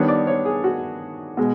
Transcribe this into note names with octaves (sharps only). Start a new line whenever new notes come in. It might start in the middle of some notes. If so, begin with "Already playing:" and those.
Already playing: D#3 G3 B3 D4 C#5
D5
C#5
G#4
F#4
B2 G#3